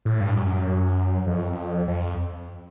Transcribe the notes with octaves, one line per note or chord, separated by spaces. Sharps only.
A2
G2
F#2
F2
F2